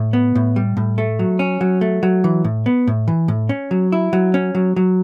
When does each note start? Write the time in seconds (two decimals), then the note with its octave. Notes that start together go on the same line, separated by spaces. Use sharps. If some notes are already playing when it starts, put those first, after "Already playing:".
Already playing: A2
0.13 B3
0.35 A2
0.56 G3
0.77 A2
0.98 A3
1.19 F#3
1.39 C#4
1.61 F#3
1.81 A3
2.03 F#3
2.24 E3
2.44 A2
2.66 B3
2.87 A2
3.08 E3
3.28 A2
3.49 C#4
3.71 F#3
3.92 E4
4.13 F#3
4.34 C#4
4.55 F#3
4.76 F#3